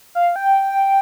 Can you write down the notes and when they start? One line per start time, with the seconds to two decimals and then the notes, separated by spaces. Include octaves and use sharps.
0.15 F5
0.36 G5